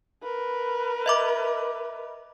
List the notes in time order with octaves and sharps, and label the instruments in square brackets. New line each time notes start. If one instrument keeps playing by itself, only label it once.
[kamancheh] A#4 B4
[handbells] D#5 E5 D6